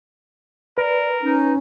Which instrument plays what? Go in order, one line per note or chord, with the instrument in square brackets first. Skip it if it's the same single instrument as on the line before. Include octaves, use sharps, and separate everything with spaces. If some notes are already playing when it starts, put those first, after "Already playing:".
[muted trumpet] A#4 [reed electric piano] B4 [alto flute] D5
[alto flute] C#4 [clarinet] D#4